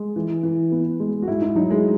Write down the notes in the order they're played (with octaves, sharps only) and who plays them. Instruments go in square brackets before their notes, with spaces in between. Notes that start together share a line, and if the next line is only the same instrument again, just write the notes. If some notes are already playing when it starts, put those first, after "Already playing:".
Already playing: [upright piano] G#3
E3
E3
B3
G#3
[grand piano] F#4
[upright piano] G#2 [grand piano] E4
[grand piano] D#4
[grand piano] F#3 [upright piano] D#4
[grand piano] G#3